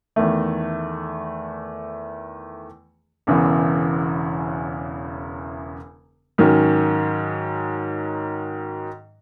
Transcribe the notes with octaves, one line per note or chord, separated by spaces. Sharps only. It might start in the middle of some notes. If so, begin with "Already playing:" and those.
E2 D#3 A3
E1 E2 C#3 E3
G#2 D#3 F#3 C#4